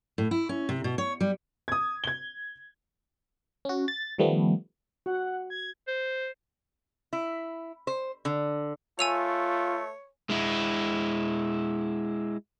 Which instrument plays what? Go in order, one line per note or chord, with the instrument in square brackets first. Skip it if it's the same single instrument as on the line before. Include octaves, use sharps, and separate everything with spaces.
[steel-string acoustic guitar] A2
E4
C#4
C3
B2
C#5
G3
[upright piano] D#6 G#6
G#6 G7
[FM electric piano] C#4 F#4
A6
D#3 F3 G3 A3 B3
[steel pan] F#4 [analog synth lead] F#5
[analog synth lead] G#6
[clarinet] C5
[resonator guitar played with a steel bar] E4
C5
D3
[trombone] A3 [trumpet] F4 [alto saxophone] C#5 [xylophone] G#5 E6 F7
[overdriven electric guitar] G#3 E4